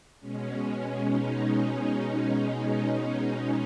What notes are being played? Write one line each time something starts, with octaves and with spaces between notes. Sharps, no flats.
B2 G#3 C#4
D#4